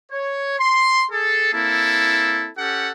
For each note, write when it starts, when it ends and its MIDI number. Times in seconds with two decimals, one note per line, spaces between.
0.12 0.57 73
0.59 1.05 84
1.12 1.53 68
1.12 1.53 69
1.54 2.49 58
1.54 2.49 60
1.54 2.49 64
1.54 2.49 69
2.58 2.91 61
2.58 2.91 67
2.58 2.91 69
2.58 2.91 78